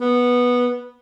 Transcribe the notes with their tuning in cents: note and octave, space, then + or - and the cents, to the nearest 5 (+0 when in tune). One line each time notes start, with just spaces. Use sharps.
B3 -10